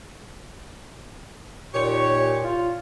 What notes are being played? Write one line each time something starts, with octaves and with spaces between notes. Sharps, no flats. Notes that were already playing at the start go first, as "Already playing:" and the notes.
D#2 A#2 G4 C#5
F4